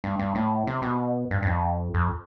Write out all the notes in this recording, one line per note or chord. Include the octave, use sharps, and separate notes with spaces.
G2
G2
A2
C3
B2
G2
G2
F2
F2